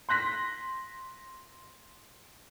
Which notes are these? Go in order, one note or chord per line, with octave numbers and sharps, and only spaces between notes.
C6 F#6 A#6 B6